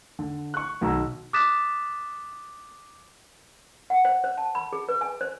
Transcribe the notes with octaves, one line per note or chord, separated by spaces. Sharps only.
D3
C#6 F#6
B1 D#3 D#4 F#4 A#5 E6
D6 D#6 F#6 A6 B6 E7
F#5
C5
C5
A5
B5
G#4
B4
G#5
C5